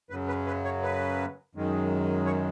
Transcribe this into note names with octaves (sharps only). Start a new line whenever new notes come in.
F#2 C#3 F#3 B4
B4
B4
C#5
B4
F#2 D#3 G#3
C#5